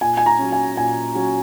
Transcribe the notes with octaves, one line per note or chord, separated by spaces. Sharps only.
A#2 G#5
G#5
A#5
F#3 C#4
G#5
A#2 G#5
F#3 C#4